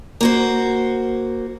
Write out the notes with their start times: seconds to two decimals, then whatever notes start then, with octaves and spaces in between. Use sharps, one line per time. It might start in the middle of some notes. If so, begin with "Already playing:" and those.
0.21 A#3 F#4 C5